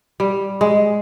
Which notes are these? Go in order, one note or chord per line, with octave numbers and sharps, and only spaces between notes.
G3
G#3